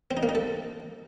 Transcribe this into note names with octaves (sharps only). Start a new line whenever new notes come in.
C4
D#4
A#3
D#4
A4